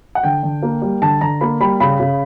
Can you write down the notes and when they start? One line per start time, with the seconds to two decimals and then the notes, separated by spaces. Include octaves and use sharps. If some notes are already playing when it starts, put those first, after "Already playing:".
0.15 F#5
0.23 D3 G5
0.43 D3
0.62 A#3
0.82 G3
1.02 D3 A5
1.21 D3 A#5
1.41 A#3 B5
1.61 G3 B5
1.80 C#3 B5
2.00 C#3